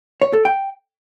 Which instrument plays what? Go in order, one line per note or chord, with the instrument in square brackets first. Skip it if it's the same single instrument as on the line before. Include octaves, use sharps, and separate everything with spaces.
[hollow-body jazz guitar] C#5
A4
G5